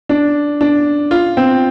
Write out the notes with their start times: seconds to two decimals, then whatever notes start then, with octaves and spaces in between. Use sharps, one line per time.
0.09 D4
0.61 D4
1.11 F4
1.37 C4